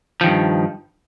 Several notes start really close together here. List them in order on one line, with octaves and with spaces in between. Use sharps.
F3 D#3 G2